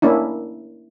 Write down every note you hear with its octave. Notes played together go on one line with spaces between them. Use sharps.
A#3 C#4 D4 E4